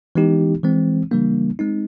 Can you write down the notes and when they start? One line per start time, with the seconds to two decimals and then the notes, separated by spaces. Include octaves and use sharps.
0.15 E3 G#3 B3 D#4 G4
0.63 E3 G#3 C4
1.11 C#3 E3 G3 A#3 D4
1.59 G#3 C4 D#4